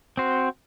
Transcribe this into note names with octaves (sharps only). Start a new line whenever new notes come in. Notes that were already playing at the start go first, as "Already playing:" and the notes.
C4 F#4 C5